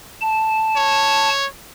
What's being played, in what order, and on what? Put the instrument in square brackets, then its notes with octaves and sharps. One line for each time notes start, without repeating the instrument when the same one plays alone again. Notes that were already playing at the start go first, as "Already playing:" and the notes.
[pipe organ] A5
[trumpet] C#5